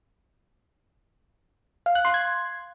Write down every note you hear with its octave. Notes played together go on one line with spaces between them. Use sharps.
F5
F#6
C6
G#6